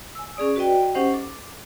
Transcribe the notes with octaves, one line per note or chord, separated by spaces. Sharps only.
G#5 E6
C#4 G#4 D5 D#6
F#4 B4 D5 D#5 G5
C#4 D#4 G4 C5 D#5 F#5
A4 D6